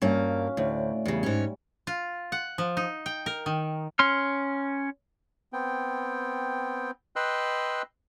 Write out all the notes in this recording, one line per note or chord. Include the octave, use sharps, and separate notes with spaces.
G2 A#3 C#4 F#4 F5
D2 A2 F#4 D5
E2 C#3 G3
G#2 C#4
F4
F#5
F3
D#4
G5
A#4
D#3
C#4 C6 F6
B3 C4 G5
B4 D#5 G5 C6 E6 F#6